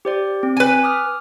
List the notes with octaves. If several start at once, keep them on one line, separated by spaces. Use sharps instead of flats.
G4 C5 D5
C4
B4 G#5
D6 D#6 F6